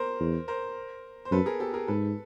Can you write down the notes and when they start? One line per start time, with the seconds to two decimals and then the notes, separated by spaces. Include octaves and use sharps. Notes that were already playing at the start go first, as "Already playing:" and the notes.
Already playing: A#4 C5
0.20 E2
0.48 A#4 C5
1.25 C5
1.31 F#2 A4 B4
1.46 G#4 A#4
1.60 G4 A4
1.73 G#4 A#4
1.87 G#2 A4 B4